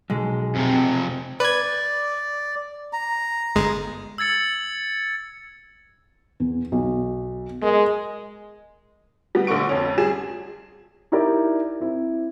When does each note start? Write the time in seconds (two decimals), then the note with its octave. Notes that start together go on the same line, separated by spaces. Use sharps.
0.10 B1 G#3
0.56 F2 C3 C4
1.40 B4 D5 G#6
2.93 A#5
3.55 G1 G#3
4.18 E6 G#6 A6 C#7 F#7
6.40 E2
6.72 B1
7.62 G#3 A#4
9.35 G3 B3
9.47 A#1 D3 A3 F#5 C#6 D7
9.69 F2 C#4
9.98 G3 G#4 E7
11.12 D#4 E4 G4 A#4 D5
11.80 C4 E4